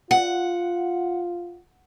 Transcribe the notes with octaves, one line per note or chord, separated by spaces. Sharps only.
F4 F#5